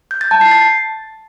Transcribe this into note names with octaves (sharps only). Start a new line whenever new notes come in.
G6
A6
A5
C7
A6